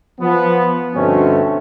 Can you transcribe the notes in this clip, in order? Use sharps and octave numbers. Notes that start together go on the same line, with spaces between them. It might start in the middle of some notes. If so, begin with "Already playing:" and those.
F3 B3
D2 G2 B2 A3 C4 C#4